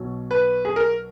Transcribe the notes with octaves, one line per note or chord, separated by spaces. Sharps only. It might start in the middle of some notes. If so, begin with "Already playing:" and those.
Already playing: B1 B2 F#3
B4
G#4
A#4